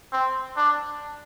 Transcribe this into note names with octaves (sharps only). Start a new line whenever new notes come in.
C4
D4